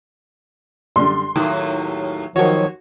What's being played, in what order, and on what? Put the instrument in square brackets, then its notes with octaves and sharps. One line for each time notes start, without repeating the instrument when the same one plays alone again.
[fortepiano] F#2 D3 G3 [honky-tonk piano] C6
[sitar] D#2 A2 F#3 [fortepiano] D#3
[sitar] D#2 C#5 [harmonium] D#3 F3 F#3 [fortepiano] F#4